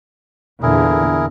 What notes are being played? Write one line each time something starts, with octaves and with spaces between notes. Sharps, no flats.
E2 A#2 D3 E4 G#4 A#4